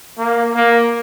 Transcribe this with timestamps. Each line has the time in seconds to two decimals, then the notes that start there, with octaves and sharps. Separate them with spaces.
0.18 A#3
0.55 A#3